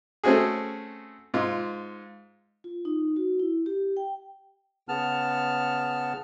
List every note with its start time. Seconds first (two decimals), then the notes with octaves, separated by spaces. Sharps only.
0.24 A3 C4 C#4 F#4 G#4
1.34 G#2 F4
2.64 F4
2.85 D#4
3.16 F#4
3.40 E4
3.66 G4
3.97 G5
4.89 C#3 B3 A5 F6